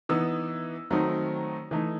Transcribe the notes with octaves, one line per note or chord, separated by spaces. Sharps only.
E3 B3 D#4 E6
D#3 F#3 A3 C4 D#4
E3 A3 D#4